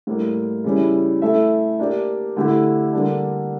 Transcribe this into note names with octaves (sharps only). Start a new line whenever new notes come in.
A2 G3 A#3
C#3 E3 G3 C#4 E4
A3 E4 A4 E5
A#3 D4 G4 D5
D3 A3 E4 G4
D3 G3 A#3 D4